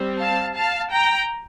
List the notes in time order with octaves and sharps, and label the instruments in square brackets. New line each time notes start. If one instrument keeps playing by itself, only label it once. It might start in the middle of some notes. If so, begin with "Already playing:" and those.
Already playing: [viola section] G3 C4
F5 A5
F5 A5
G5 A#5